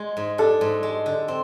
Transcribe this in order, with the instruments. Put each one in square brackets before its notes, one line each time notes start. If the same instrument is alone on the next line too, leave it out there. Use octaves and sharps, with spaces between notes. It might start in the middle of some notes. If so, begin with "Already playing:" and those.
Already playing: [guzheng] G#3
G#2
[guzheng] D4 [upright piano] A4
[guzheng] G#2
G#3
D3
C4